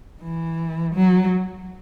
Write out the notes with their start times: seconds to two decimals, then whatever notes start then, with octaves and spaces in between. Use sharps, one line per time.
0.22 E3
0.95 F#3